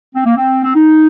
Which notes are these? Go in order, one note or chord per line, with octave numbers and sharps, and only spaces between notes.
C4
A#3
C4
C4
D#4